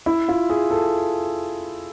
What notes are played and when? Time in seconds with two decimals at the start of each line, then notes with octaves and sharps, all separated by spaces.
0.06 E4
0.28 F4
0.50 G#4
0.71 A4